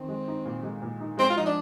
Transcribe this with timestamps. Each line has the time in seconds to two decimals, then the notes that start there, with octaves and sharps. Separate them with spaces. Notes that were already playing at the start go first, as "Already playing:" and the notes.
Already playing: D#3 C4
0.08 G#3
0.28 D#4
0.45 A#2
0.63 G#3
0.82 A#2
1.00 D#4
1.18 G#3 C4
1.30 F4
1.36 F3 D#4
1.46 D4